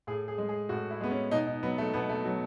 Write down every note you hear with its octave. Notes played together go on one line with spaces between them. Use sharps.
A2 G#4
G#4
G#3
G#4
A2 F#4
E4
G#3 B3
C#4
B2 D#4
D#4
F#3 B3
A3
B2 B3
A3
F#3